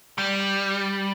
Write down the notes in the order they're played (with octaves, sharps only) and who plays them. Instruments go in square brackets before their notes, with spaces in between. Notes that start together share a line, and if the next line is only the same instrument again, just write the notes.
[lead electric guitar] G3